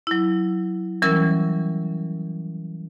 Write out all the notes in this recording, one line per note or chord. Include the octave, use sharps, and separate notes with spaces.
F#3 E4
E3 F#3 G3 C#4 A#4 E6